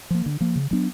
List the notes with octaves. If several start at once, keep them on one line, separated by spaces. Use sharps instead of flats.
F3 A#3
D3
F3 A#3
C#3
F#3 B3 D4